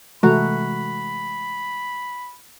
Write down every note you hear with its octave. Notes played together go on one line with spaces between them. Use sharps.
C3 E3 G#3 A3 F#4 A#5 B5